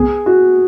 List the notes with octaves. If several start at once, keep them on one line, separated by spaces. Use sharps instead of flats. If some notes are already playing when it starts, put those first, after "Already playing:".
Already playing: B3 G#4
F#4